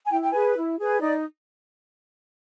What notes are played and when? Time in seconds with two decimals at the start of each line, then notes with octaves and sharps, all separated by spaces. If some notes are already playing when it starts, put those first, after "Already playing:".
0.06 G#5
0.10 E4 G5
0.22 G5
0.32 G#4 B4 G#5
0.56 E4
0.78 G#4 B4
1.00 D#4 D5